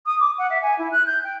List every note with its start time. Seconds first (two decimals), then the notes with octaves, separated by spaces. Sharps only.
0.06 D#6
0.19 D6
0.38 F#5
0.50 E5
0.62 G#5
0.78 E4
0.91 F#6
1.06 G6
1.24 G5